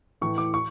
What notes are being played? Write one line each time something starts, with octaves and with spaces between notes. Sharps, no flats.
A2 E3 C#6
D6
C#6